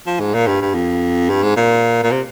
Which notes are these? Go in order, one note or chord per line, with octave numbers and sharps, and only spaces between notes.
F3
G#2
A#2
G2
G2
F2
G2
G#2
A#2
A#2
C3